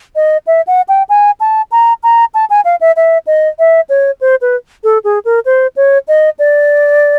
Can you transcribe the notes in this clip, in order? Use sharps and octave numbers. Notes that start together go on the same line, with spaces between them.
D#5
E5
F#5
G5
G#5
A5
A#5
A#5
A5
G#5
F5
E5
E5
D#5
E5
C#5
C5
B4
A4
G#4
A#4
C5
C#5
D#5
D5